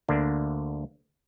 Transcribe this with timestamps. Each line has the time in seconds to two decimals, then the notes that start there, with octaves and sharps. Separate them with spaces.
0.08 D2 D3 A#3 D4